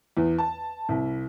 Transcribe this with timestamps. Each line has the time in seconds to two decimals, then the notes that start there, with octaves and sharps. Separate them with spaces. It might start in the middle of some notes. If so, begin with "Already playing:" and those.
0.17 E2
0.38 A5
0.89 C2